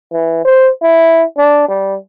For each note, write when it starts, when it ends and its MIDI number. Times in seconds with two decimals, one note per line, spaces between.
0.11 0.43 52
0.45 0.69 72
0.82 1.23 64
1.37 1.65 62
1.68 1.97 55